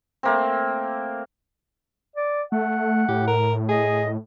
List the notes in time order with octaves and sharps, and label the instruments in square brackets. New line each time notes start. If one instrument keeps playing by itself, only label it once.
[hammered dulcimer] A3 A#3 C4
[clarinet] D5
[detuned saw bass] A3 [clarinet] F#5
[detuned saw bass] A2 [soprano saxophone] G4
[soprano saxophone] A#4
[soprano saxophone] G#4 [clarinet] D#5